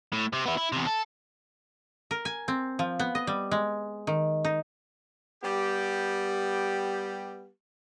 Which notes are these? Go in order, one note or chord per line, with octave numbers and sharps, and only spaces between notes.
A2
C3
B3 E4
E4
E2 C3
A4
A#4
G#5
C4
F3
B3
D#5
G3
G#3
D#3
D#4
G3 B3 G4